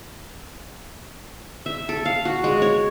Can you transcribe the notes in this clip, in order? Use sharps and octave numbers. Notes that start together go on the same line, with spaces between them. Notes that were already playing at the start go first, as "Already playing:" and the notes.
E5
A4
F5
F#4
G#3
C#5